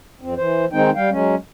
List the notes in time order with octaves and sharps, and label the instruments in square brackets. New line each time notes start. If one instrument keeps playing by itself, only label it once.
[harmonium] F2 C4
E3 C5
D#3 G#3 C4 D#4 G5
G3 F5 G5
F#3 G#3 C#4